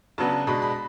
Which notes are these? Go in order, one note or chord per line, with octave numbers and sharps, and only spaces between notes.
C#3 F#3 B3 D4 A5
B2 G#3 D4 B5
B5